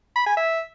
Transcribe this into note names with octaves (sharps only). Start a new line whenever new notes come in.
B5
G#5
E5